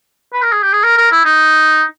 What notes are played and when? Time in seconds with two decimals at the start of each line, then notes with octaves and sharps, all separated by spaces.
0.33 B4
0.42 A#4
0.52 G#4
0.63 G4
0.73 G#4
0.83 A#4
0.98 A#4
1.11 E4
1.25 D#4